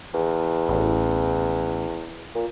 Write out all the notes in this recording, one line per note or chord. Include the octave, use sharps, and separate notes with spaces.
E2
A1
A#2